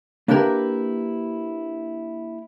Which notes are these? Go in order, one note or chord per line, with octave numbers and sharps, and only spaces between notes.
A#3 D4 E4 G4 A#4 B4